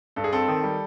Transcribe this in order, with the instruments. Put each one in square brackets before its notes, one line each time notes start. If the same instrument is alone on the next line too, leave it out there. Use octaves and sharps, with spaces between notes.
[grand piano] G2 A4
G#4
C4 A4
D#3
G3